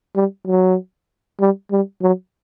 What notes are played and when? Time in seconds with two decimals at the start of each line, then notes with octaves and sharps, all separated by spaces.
0.15 G3
0.47 F#3
1.40 G3
1.71 G3
2.02 F#3